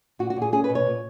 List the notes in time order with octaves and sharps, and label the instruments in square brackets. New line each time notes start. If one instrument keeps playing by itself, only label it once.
[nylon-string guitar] A#2 F#4
F#4
A#2
G#4
C#4 G#4
B4
B2
C#5
A#2